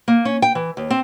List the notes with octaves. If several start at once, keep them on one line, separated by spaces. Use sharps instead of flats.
A#3
C#4
G5
E3
D#2
C4